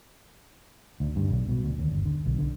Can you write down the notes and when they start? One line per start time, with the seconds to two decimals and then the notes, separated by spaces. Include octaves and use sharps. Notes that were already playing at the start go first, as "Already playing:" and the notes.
1.00 D2
1.16 G2
1.31 B1
1.49 B2
1.63 D2
1.79 D#2
1.91 G1
2.05 D3
2.26 B1
2.38 D3